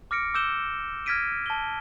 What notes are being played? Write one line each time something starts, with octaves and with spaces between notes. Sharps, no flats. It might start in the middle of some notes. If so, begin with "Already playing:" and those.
D6 F6 A#6 C#7 D7
D6 E6 G6 E7 G7
F6 G#6 A#6 B6 D7 D#7
A5 G7